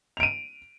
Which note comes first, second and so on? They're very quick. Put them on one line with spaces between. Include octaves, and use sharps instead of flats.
F7 D7 D#7